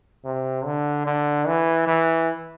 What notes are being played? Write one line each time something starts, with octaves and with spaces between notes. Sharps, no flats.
C3
D3
D3
E3
E3